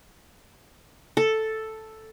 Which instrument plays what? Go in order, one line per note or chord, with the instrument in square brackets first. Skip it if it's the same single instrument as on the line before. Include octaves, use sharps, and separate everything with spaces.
[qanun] A4